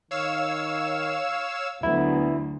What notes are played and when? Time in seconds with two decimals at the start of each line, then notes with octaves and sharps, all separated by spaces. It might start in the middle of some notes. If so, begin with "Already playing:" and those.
0.11 D#3 C#5 F5 E6
1.83 D2 F#3 B3 E4